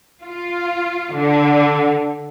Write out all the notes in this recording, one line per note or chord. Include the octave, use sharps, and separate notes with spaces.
F4
D3